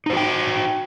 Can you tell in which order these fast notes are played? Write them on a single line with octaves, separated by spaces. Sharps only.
D#4 C5 F#4 G5